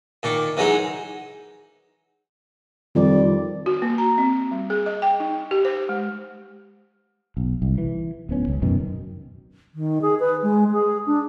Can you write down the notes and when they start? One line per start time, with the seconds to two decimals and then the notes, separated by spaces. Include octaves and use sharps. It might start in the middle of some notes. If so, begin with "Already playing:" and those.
0.23 A#2 D#3 C#6 D6
0.57 E3 F#3 G#3 D#4 G#4
2.95 F2 D#3 G3 D5
3.66 F#4
3.82 A#3
3.98 A#5
4.18 C4
4.52 G3
4.70 G#4
4.86 D#5
5.02 G5
5.20 D#4
5.51 G4
5.65 C5
5.89 G#3
7.37 B1
7.62 C2
7.78 E3
8.29 D1 B3 C#4
8.48 C#2
8.62 F#2 B2 D#3
9.74 D#3
10.02 G#4
10.20 B4
10.42 G#3
10.72 G#4
11.06 D4